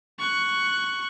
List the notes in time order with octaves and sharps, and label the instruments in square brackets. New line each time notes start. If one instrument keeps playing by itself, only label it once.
[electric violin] C#6 F#6